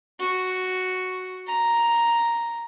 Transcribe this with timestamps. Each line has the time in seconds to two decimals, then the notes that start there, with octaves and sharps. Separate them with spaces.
0.20 F#4
1.48 A#5